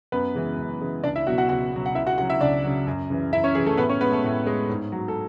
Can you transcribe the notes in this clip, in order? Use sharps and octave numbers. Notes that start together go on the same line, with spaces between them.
F#2 B3 B4
C#3 E3 G#3
F#2
C#3 E3 G#3
C#2 D4 D5
E4 E5
B2 F#3 F#4 F#5
F#4 F#5
C#2 F#4 F#5
B2 F#3
F#5
C#2 E4 E5
F#4 F#5
C#3 F#3 F#4 F#5
E4 E5
C#2 D4 D5
C#3 F#3
F#2
C#3 E3
F#2 E4 E5
C#4 C#5
C#3 E3 G#4
A3 A4
A2 B3 B4
C#4 C#5
G#3 B3 B4
A3 A4
A2
G#3
G#2
F#3
A4